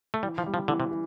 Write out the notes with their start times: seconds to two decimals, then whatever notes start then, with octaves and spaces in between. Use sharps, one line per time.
0.14 A3
0.23 E3 G3
0.38 F3
0.46 G3
0.54 F3
0.68 D3 E3
0.80 C3
0.91 E3